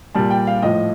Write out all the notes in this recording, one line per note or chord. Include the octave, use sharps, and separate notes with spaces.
A#2 G3 A5
G5
F5
A2 F3 D#5